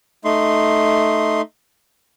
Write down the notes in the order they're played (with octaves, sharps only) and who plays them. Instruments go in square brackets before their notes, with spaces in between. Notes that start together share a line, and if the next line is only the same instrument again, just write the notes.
[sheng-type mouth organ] A3 D#4 C6